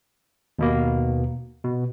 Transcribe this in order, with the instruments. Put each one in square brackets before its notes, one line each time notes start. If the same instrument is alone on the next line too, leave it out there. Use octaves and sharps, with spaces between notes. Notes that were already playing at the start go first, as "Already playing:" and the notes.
[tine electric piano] D#2 B2 A#3
B2